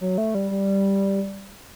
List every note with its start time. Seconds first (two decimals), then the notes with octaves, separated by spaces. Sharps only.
0.01 F#3
0.18 A3
0.35 G3
0.51 G3